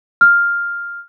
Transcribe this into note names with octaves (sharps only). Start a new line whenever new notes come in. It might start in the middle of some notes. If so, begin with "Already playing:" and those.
F6